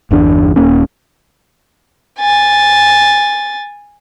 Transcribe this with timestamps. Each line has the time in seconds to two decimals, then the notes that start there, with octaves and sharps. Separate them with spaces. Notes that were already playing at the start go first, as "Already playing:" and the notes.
0.11 G1 E2 D4
0.56 D#1 A#3 C#4
2.18 G#5 A6